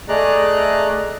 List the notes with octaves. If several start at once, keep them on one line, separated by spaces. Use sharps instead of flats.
A3 G#4 D5 D#5 A#5 F#6